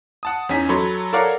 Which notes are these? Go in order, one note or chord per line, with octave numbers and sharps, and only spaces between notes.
F#5 A5 D#6
E2 C#4 D#4 G#5 B6
F#3 A4 C#5 B5 C6
A4 A#4 C#5 D5 F5 F#5